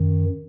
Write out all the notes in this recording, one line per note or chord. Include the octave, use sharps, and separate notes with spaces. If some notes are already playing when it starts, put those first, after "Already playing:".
Already playing: F#2 D#3